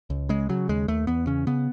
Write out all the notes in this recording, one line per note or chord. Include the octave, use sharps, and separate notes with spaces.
C#2
C#3 G#3
C#3 F#3
D#2 G#3
D#2 A3
E2 B3
C#3 C#4
C#3 B3